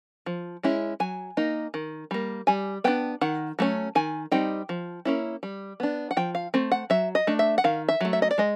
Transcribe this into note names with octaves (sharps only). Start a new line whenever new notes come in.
F3
G#3 C#4 E4
F#3 G#5
A#3 D#4
D#3
G3 A#3
G3 G#5
B3 D4 G5
D#3 F#5
F#3 A3 C#4
D#3 G#5
G3 C4 D#4 G5
F3
A#3 C#4 E4
G3
B3 D4
F#5
F3 G5
F5
A3 C4
F#5
F#3 E5
D#5
A3 D4
E5
F#5
D#3 F5
E5
F#3 A3
E5
D#5
D5
G#3 D#5